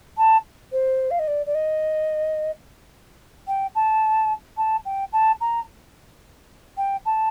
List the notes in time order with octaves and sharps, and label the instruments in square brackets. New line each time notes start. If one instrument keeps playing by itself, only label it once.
[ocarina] A5
C5
F5
D#5
D5
D5
D#5
G5
A5
A5
G5
A5
A#5
G5
A5